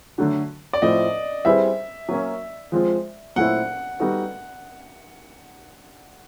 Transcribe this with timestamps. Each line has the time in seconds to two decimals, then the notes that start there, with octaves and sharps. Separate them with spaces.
0.18 D3 F#3 A3 D4 F#4
0.73 D5
0.82 A2 F3 A3 C4 D#5
1.45 G3 C4 E4 G#4 B4 E5
2.09 F#3 A#3 C#4
2.72 F3 G#3 C4 F4
3.36 A#2 F#3 A3 C4 E4 F#5
4.00 G3 B3 D#4 F#4 A4